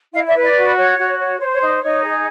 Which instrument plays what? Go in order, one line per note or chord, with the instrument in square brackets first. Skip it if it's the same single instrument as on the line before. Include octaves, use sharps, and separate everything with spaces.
[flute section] E4 D#5 F5
D5 E5
B4
D5
F#4
C#5
F#4
C#5
C5 C#5
C#5
D#4
D5
D#4 C#5 D#5
G#4